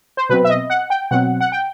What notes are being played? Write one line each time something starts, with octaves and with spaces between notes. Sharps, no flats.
C5
B2 F#3 C4 B4
E5
D#5
F#5
G5
B2 F#3 C4 F#5
F#5
G5